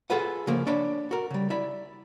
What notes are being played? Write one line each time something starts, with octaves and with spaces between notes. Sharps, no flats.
F4 G#4 A4 B4 F#5
C#3 F3 A#3
D4 C#5 D5 B5
F#4 A#4
C#3 G3
E4 D5 B5